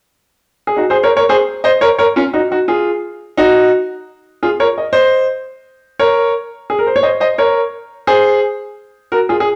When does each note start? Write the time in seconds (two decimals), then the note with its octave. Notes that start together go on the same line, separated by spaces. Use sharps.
0.67 G#4
0.76 D#4 F#4
0.90 G#4 C5
1.03 A#4 C#5
1.16 A#4 C#5
1.29 G#4 C5
1.64 C5 D#5
1.81 A#4 C#5
1.98 A#4 C#5
2.16 C#4 F4
2.33 D#4 F#4
2.51 D#4 F#4
2.68 F4 G#4
3.37 D#4 F#4
4.43 F4 G#4
4.60 A#4 C#5
4.78 D#5
4.93 C5 D#5
5.99 A#4 C#5
6.70 G#4
6.79 A#4
6.87 C5
6.96 C#5
7.03 C5 D#5
7.20 C5 D#5
7.38 A#4 C#5
8.07 G#4 C5
9.12 F#4 A#4
9.29 F4 G#4
9.40 G#4